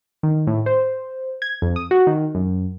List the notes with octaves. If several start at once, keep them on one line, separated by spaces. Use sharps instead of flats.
D#3
A2
C5
G#6
F2
D#6
F#4
D#3
F#2